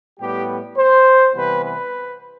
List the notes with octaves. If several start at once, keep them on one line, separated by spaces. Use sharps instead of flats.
A2 G3 B3 G4
C5
C3 E3 G3 B3 B4
B4